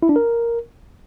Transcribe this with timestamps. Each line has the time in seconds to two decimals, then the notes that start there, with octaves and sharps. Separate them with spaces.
0.03 E4
0.09 D4
0.16 A#4